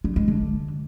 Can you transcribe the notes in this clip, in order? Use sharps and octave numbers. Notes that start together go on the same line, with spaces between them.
F#3
G#3
D3